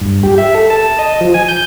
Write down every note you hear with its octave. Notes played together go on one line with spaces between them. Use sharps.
G2
G4
E5
A4
A5
D#5
F3
G#5
G6